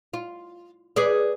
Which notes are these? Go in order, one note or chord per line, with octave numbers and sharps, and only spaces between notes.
F4
G#4 B4 D5